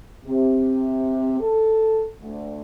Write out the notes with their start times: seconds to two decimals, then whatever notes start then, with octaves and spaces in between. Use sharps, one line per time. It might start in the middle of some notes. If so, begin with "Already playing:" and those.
0.25 C3
1.40 A4
2.21 D2